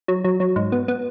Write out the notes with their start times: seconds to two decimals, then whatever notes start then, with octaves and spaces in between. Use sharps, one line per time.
0.08 F#3
0.25 F#3
0.40 F#3
0.56 G#2
0.72 B3
0.88 B3